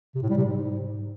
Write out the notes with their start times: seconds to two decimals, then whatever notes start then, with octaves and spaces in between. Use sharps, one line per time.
0.15 C3
0.22 A2
0.30 G3
0.37 C3
0.45 G#2